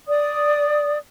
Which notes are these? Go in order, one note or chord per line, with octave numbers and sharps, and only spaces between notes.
D5 D#6